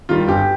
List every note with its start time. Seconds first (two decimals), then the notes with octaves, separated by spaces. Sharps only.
0.09 D#3 G3 F4
0.27 G1 G4